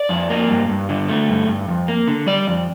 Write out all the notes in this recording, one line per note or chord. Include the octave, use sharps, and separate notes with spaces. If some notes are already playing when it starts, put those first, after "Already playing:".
Already playing: D5
F2
A#3
G2
G2
D3
A3
G2
G2
F2
A#3
D3
G3 D5
F2